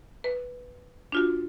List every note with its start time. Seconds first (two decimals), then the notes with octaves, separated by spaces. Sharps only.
0.24 B4
1.12 D4 F4 F#4